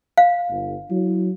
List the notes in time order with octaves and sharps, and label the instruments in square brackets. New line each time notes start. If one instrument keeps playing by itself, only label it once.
[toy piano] F5
[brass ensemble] G1
F#3 E4